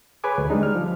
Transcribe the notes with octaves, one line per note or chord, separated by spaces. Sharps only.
G#4 B4 C#5 G#5 D6
D2
G3 G#3 D4 D#4
F6
F3